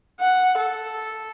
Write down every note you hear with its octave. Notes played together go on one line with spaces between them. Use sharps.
F#5
A4